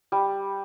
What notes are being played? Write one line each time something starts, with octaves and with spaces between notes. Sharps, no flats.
G3